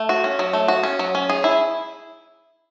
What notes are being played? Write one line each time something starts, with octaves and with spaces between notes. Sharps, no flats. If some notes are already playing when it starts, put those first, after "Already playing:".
Already playing: A3
F#4
C#4
F#3
A3
F#4
C#4
F#3
C#4
G#4
E4